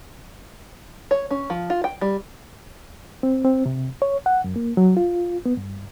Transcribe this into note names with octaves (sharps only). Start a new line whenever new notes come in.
C#5
C#4
F3
F4
G5
G3
C4
C4
C3
C#5
F#5
F#2
A#3
F#3
F4
B3
G2